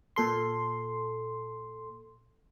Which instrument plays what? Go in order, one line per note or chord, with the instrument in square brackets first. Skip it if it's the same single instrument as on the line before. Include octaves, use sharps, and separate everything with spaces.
[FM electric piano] A#2 A4 C6